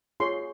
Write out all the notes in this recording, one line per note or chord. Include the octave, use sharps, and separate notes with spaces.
F4 G#4 C#5 C6